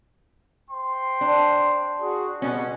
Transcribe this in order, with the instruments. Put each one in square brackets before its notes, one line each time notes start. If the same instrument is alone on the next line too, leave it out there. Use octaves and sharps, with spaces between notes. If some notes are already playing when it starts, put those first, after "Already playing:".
[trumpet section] C5 G5 C6
[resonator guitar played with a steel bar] D4
[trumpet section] F#4 G#4
[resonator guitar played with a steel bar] B2 C#4 [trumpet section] G3 G#3 F#5